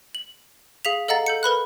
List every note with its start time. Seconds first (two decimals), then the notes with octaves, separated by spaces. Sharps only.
0.15 F#7
0.85 G#4 F5 B6 F7
1.08 A4 D#5 F5 F#5 A#5 A6
1.26 A4 G6 C#7
1.43 A#4 B4 B5 F#6